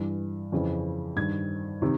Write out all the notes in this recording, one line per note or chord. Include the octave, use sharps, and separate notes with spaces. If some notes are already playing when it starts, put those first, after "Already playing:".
Already playing: G2 E3
F2 C#3 E3
G2 D#3 G#6
C3 D#3